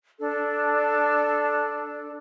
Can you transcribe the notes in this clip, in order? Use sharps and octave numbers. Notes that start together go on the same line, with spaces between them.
D4 A4